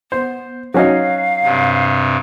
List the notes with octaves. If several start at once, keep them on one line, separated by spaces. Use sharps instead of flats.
B3 C5
F#3 C#4 D#4 F5
G2 C3